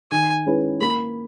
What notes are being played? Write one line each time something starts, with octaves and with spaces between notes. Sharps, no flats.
D#3 G#5
G#3 C#4 E4 B4
A#3 B5